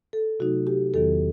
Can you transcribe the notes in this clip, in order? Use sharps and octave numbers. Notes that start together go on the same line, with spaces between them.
A4
C3 F#3 A3 D#4 F#4
G4
E2 D#3 F#3 B3 A4